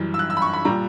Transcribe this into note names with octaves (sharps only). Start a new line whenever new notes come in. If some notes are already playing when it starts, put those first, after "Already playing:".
Already playing: F#2 E3 G3
E6
F#6
E6
B5
C#6
B5
A#2 G3 A#5